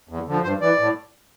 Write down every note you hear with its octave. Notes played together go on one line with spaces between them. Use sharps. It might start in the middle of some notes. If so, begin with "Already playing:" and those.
E2
D3 F3
G2 C5
E3 D5
A2